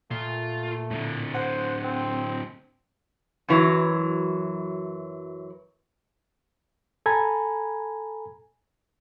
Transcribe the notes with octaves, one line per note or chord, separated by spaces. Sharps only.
A#2 A3 F4
A2 D3
C5 F#5
C4
F#2 E3 F#3
A4 G#5 A#5 B5 G#6